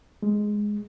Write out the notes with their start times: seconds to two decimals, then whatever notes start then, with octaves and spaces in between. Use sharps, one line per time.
0.22 G#3